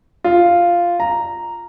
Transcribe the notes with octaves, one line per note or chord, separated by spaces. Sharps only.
F4
A#5